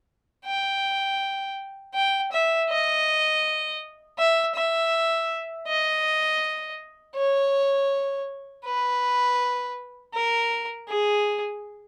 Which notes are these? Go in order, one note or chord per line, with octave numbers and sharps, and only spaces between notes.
G5
G5
E5
D#5
E5
E5
D#5
C#5
B4
A#4
G#4